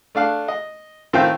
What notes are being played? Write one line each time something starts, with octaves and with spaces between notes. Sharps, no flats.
A3 D4 F5 F#6
D#5
A2 D#3 C4 F4 E5 G5